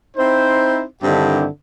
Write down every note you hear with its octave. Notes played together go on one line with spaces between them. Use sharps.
C4 D#4 E4 C5
G2 D3 D#3 C4 E4 G4